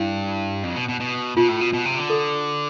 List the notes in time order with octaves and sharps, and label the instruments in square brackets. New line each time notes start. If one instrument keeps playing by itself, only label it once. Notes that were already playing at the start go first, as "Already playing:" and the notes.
Already playing: [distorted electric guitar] G2 [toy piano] E4
[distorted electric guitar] F2
B2
B2
B2
[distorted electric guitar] B2 [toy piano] F4
[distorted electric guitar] A2
B2
B2
C3
D3
[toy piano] A4